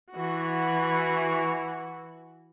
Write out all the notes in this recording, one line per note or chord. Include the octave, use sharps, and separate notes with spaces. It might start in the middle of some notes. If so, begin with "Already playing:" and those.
E3 F#4